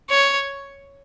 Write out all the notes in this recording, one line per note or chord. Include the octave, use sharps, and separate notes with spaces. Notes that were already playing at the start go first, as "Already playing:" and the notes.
C#5